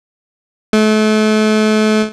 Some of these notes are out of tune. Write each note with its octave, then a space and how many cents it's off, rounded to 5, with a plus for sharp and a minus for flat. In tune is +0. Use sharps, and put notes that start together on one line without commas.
A3 -35